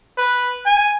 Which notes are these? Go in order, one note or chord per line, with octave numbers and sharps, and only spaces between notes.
B4
G#5